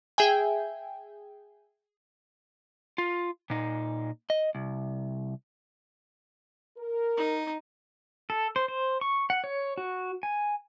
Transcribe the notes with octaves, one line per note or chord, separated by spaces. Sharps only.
G#4 E5 G5 G#5
F4
A#2 D#4
D#5
C2
A#4
D#4
A4
C5
C5
C#6
F#5
C#5
F#4
G#5